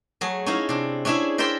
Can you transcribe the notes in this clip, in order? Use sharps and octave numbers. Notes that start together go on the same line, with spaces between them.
F#3 A3 G#4
C#4 D#4 E4 F5 A#5
C3 D4
C#4 D4 E4 G#4 E5
A#4 C5 D5 E5 G5 C6